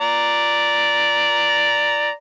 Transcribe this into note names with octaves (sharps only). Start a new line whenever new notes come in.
D5 A#5